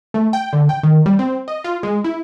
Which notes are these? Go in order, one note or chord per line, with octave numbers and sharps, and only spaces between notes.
A3
G5
D3
G5
D#3
G3
C4
D#5
F4
G#3
E4